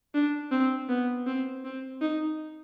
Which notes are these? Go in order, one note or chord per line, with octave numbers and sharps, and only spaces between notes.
D4
C4
B3
C4
C4
D#4